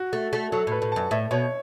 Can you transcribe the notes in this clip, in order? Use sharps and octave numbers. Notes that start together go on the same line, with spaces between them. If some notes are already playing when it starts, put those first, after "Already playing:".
Already playing: F#4
A3
A3
F#3 A4
A2 B4
A2
A5
F#2
A2 E5
B2 C#5